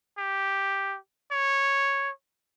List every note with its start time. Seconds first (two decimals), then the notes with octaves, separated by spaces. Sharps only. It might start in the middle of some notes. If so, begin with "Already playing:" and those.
0.18 G4
1.31 C#5